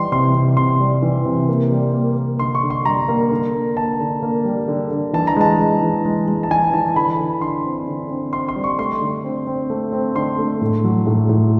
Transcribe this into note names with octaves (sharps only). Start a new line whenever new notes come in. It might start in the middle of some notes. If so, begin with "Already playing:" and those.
Already playing: E3 G3 C6
C3 C6
C3
C3 C6
G3
E3
C3
A#3
G3
A#3
A#3
D3 C6
C#6
D3
C6
G3 A#5
A#3
D3
A#3
A#3 A5
D3
A#3
G3
D3
D3
E3 A5
A#5
G#3 A5
G#3
E3
G#3
G#3
A5
E3 G#5
E3 A5
D3 B5
D3
D3 C6
C4
D3
C4
C4 C6
C6
G3
C#6
A3 C6
D3
C4
C4
A3
C4
D3 C6
A3
A2
F#3
A2
A2